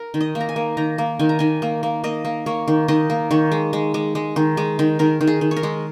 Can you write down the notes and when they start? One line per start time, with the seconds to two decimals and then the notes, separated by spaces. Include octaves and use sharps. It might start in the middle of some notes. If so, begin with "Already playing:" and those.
Already playing: A#4
0.14 D#3
0.21 D#5
0.35 A#3
0.40 A#5
0.49 G#5
0.56 A#3
0.77 D#3 A#5
0.98 A#3
1.19 D#3 G#5
1.29 A#5
1.39 D#3 G#5
1.62 A#3
1.83 A#3
2.04 A#3 D#5
2.25 A#3
2.46 A#3 C#5
2.68 D#3
2.88 D#3 D#5
3.10 A#3
3.31 D#3 C#5
3.52 G#3
3.73 G#3
3.94 G#3
4.15 G#3
4.36 D#3
4.57 G#3
4.79 D#3
4.99 D#3 A#4
5.21 D#3
5.27 G#4
5.41 D#3
5.51 C#5
5.56 A#4
5.63 G#3